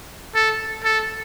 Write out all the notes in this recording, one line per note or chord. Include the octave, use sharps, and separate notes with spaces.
A4
A4